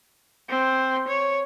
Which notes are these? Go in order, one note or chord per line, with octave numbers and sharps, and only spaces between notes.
C4
C#5